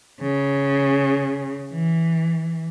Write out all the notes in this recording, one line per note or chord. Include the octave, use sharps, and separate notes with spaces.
C#3
E3